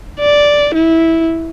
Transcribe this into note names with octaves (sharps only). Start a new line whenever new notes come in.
D5
E4